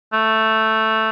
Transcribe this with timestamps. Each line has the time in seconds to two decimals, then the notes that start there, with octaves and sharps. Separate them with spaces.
0.13 A3